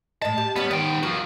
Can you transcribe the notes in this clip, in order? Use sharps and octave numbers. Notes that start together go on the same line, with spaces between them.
A2 D#5 A5
G4
G3 B3 C#4
D#3 B3 G5
F3 F#4 A#4